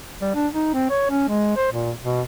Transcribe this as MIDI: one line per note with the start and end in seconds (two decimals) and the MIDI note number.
0.21 0.30 55
0.35 0.47 62
0.53 0.69 63
0.74 0.86 60
0.90 1.10 73
1.10 1.28 61
1.29 1.54 56
1.56 1.70 72
1.72 1.92 46
2.02 2.21 47